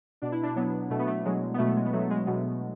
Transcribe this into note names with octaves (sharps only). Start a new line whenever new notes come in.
B2 D4
E4
D4
F#3 B3
B2 A3
B3
A3
F#3 G#3
B3
B2 A3
G#3
B3
F#3 A3
G#3
B2 B3